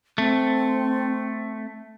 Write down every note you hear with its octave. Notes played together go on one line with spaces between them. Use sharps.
A3 C4